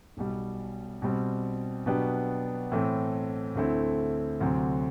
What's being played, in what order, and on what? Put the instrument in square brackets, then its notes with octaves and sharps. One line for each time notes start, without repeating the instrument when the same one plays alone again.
[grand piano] B1 B2 G3
B2 G3 C4
B2 F#3 B3 D4 G4
A2 E3 A3 C4
D2 D3 A3 C4 E4
D2 C3 F#3 C4